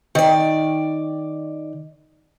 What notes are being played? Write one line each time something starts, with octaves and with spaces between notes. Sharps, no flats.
D#3 D5